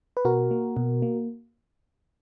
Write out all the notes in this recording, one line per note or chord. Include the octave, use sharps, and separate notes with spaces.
B4
B2 F#4 A#4
A#3
B2
A#3